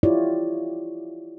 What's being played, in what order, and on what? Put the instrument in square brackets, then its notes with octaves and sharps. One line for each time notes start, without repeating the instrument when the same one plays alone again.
[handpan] E4 F4 G4 C#5 D5